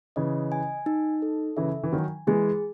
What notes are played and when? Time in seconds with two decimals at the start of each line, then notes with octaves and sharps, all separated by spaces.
0.16 C#3 E3 D#5
0.52 G#5
0.86 D#4
1.22 A4
1.57 C#3 E3 E5
1.84 E3
1.92 D#3 F#3 G#5
2.27 E3 G#3 G#4